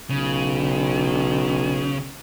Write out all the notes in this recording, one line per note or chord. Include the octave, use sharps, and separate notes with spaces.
B1 C#3